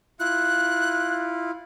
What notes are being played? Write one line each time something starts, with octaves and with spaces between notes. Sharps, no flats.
E4 F4 F#6